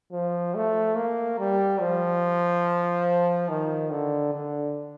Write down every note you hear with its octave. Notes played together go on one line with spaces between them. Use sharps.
F3
A3
A#3
G3
F3
D#3
D3
D3